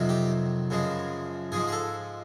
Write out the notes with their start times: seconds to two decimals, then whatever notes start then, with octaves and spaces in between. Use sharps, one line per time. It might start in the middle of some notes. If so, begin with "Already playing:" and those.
Already playing: F2 C3 D#3 F#3
0.09 G4
0.70 F#2 C#3 F3 G#3
1.52 G#2 F3 G#3 G#4
1.68 G#4
1.72 A4